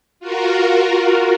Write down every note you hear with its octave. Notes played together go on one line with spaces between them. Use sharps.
F4 F#4 A#4